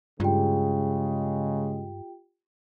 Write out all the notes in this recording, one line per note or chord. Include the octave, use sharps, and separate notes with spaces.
G2 C#3 G#3 F4 G4 G5